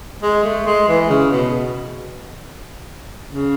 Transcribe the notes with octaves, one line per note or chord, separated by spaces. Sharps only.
G#3
A3
G#3
E3
C#3
B2
C#3